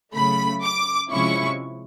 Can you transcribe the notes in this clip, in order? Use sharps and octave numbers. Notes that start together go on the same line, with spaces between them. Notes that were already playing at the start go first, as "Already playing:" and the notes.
C#3 F#3 A3 B5
D6
C3 F3 G#3 C#4 E4 C#6